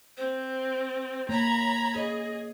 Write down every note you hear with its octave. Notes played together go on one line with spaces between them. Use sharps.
C4 C5
A#3 C#5 A#5 B5 G#6
G#4 C#5 D#5